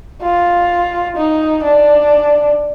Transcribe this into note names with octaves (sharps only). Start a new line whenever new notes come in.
F4
D#4
D4